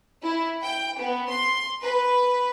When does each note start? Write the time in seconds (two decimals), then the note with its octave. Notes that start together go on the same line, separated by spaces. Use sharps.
0.23 E4
0.62 G5
0.98 B3
1.30 C6
1.82 B4